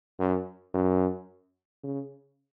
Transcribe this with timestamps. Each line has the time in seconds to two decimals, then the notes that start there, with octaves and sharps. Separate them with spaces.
0.19 F#2
0.74 F#2
1.83 C#3